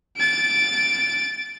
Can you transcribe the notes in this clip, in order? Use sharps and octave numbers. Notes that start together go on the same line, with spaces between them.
A6 D7